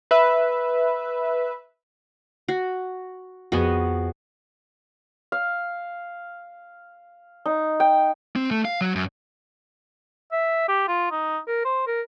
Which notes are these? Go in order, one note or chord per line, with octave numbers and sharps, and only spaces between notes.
B4 E5
F#4
F2 B3 F#4 G#4 D#7
F5
D#4
G5
C4
A3
F5
F#3
F#2
E5
G4
F4
D#4
A#4
C5
A#4